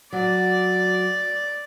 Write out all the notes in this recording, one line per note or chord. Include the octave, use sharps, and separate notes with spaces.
F#3 D5